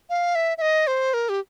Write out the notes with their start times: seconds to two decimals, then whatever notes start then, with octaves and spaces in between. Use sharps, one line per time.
0.10 F5
0.35 E5
0.58 E5
0.62 D#5
0.87 C5
1.14 A#4
1.29 G4